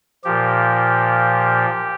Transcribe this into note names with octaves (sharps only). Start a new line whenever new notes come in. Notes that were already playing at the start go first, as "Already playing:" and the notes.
A#2 F3 G4